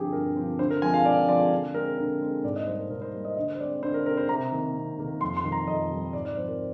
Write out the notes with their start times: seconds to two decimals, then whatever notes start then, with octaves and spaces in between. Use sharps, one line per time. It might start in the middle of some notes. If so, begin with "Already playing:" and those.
Already playing: G2 D3 F3 C4 G4 G#4
0.13 G2 A#4
0.36 D3 F3 C4
0.59 D3 C5
0.70 A#4
0.82 F3 G#3 C4 G#5
0.94 F5
1.05 D3 D5
1.28 F3 G#3 C4 D5
1.52 D3
1.74 G#3 C4 A#4
1.98 D3 A#4
2.21 G#3 C4
2.44 G#2 D5
2.56 D#5
2.67 G3 A#3 C5
2.78 A#4
2.90 G#2 A#4
3.02 C5
3.13 G3 A#3
3.25 D#5
3.37 D3 D#5
3.55 C5
3.59 G#3 D5
3.63 C4
3.82 D3 C5
3.94 A#4
4.06 G#3 C4 A#4
4.17 C5
4.29 C3 A#5
4.52 D#3 A#3
4.75 C3
4.99 D#3 A#3
5.21 F2 C6
5.37 C6
5.44 D#3 G3
5.52 A#5
5.68 F2 D#5
5.91 D#3 G3
6.13 G#2 D5
6.25 D5
6.37 F3 C4 C5
6.48 A#4